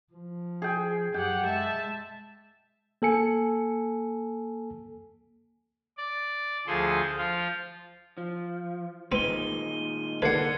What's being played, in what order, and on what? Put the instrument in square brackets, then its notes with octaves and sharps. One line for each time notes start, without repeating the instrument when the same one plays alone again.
[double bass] F3
[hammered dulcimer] G#4 G5
[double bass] F#2 [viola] G4 F#5 [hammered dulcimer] G5
[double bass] G#3 [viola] E5 A5
[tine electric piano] A#3 A4 G#5 C#7
[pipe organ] D5
D2 F3 G#4 A4 C6
F3 F4
[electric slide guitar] F3
[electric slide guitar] A#2 D#3 G#3 [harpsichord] C4 B4 [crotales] D#7 G7
[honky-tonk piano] D3 A#3 [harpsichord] B4 F#5 [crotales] G#6 C7 C#7